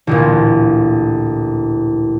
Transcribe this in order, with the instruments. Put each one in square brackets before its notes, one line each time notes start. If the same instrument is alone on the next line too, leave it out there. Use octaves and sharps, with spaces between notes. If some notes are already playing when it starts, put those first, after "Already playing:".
[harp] A1 D2 A#2